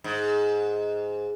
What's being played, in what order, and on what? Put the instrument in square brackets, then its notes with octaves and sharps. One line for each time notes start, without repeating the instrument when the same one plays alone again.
[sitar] G#2